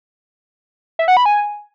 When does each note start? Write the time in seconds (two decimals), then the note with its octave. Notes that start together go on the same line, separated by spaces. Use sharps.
0.99 E5
1.08 F#5
1.17 B5
1.26 G#5